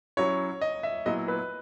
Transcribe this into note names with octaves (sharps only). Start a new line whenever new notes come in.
F#3 C#4 E4 C#5
D#5
E5
A#2 F#3 B3 E4 D#5
B4